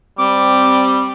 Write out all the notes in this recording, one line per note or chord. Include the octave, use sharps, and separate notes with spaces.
G3 C4 D6